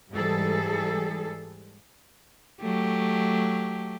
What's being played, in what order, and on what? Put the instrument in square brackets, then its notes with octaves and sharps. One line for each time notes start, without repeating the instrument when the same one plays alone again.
[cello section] G#2 E3 G3 G#4 A4
[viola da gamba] F#3 A3 G4